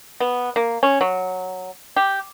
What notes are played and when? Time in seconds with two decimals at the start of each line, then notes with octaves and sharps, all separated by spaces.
0.20 B3
0.56 A#3
0.83 C#4
1.01 F#3
1.96 G4